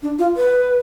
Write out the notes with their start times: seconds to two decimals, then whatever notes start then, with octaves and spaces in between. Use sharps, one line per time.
0.02 D4
0.19 F4
0.37 B4